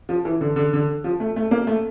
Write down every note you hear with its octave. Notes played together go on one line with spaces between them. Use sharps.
F3
E3
D3
D3
D3
F3
A3
A3
A#3
A3